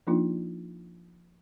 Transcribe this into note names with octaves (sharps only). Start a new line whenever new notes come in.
F3 A#3 D4 D#4 F4